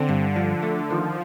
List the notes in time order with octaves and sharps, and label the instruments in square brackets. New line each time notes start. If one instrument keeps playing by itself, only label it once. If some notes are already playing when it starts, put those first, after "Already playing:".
Already playing: [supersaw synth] D3 [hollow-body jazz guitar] C4
[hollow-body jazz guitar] G2
F3
A3
[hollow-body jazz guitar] D#3 [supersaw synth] F3